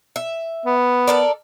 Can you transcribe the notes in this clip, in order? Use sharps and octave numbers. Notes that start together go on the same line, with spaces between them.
E5
B3
A4 A#4 D5